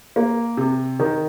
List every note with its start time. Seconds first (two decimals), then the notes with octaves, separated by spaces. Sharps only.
0.16 A#3
0.57 C3
1.00 D#3